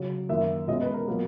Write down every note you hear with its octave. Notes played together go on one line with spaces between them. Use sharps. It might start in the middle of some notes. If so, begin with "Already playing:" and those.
Already playing: C#3 F#3 C#4
F#2 D#3 A#3 E5
B2 G#3 C#4 D#5
B4
A#4
B2 F#3 A#3